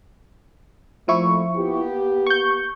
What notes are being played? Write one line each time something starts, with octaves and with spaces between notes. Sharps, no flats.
F2 A#2 F3 A3 E4 C#6
A#3 B3 G4
C#6 G6